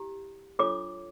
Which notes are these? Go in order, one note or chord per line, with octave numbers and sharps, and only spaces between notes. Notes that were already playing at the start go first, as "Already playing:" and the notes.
Already playing: E4 G4
D4 F4 A4 C#5 D6